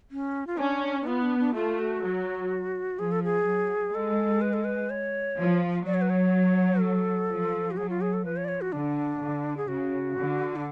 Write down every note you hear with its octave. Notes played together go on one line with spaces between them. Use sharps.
C#4
F4
C#4 D4
D4
B3 F4
D4
D4
A3 F4
F#4
F#3
F3 G#4
A4
G#4
F#3
G#3 A4
B4
A4
B4
C#5
F3
F#3 D5
C#5
B4
C#5
A4
F3
F#4
F#3 G#4
F4
G#4
A4
F3 B4
C#5
D5
C#5
F#4
D3 D4
D3
G#4
C#3 F#4
D3
D4